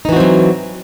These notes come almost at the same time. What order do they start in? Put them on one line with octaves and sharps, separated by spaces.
D#4 E3 F#4 C4 F#3